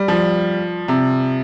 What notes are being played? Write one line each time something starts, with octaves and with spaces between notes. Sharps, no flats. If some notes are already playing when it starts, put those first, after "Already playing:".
Already playing: G3
F3
C3